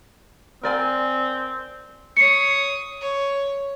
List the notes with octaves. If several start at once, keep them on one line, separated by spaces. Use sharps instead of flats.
C4 A#4 D5 G#5
C#5 D#6 C7 C#7
C#5